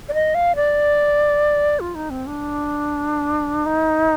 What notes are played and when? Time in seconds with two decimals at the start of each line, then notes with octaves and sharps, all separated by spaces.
0.09 D5
0.14 D#5
0.35 F5
0.56 D5
1.80 F4
1.95 D#4
2.10 C4
2.27 D4
3.66 D#4